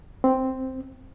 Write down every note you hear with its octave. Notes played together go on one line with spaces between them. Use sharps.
C4